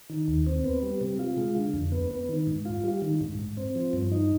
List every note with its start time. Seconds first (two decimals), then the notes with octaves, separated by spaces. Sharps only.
0.10 D#3
0.28 D#2
0.47 C4
0.64 B3
0.83 G3
1.01 C3
1.19 F4
1.38 G#3
1.56 D3
1.74 F2
1.92 B3
2.11 B3
2.29 D#3
2.47 G#2
2.65 F4
2.84 G3
3.02 D#3
3.21 G#2
3.39 G#2
3.57 C4
3.75 F3
3.93 G2
4.12 D#4